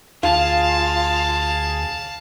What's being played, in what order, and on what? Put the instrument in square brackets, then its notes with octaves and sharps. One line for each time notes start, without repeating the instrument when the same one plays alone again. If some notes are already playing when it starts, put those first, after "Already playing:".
[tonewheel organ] D2 G#4 [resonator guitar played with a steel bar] F4 [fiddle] F5 A5